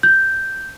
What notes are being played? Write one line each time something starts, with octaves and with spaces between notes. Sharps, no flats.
G6